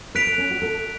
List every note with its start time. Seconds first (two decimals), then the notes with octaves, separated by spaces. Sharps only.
0.15 B4 F#6 B6 D7 F7
0.27 A4
0.38 C#4
0.51 F#4
0.62 A4